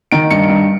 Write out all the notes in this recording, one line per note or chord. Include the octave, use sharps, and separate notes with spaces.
D#3 D7
G2 C#7
G2